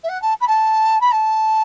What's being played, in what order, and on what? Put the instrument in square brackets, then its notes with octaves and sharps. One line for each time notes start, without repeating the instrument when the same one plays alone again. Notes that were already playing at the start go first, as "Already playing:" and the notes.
[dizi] E5
F#5
A5
B5
A5
B5
A5